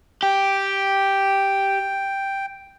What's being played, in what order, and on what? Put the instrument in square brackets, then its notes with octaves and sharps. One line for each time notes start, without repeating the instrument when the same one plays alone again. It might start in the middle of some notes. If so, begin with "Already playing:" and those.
[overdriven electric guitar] G4 [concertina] G5